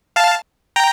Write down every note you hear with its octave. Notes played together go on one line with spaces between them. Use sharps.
F5 A5
G5 A#5